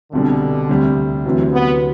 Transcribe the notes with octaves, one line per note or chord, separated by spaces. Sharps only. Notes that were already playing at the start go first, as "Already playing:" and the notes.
C2 B2 D3 G3
D2 C3 G3
D2 C3 E3 F#3
B3